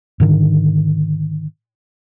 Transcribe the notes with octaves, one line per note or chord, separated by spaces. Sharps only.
G#2 D3 D#3